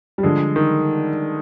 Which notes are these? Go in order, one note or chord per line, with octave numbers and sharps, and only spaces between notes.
G3
D3 F3 G#3
D#3